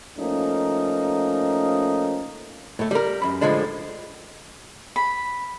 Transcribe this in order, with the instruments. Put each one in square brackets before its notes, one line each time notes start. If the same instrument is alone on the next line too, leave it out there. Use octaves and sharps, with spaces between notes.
[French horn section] F3 A3 A#3 C#4 D#4
[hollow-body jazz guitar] A2 A3
G3 A#4
F#2 B5
A2 D3 D#3 F3 G#3 D4
[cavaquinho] B5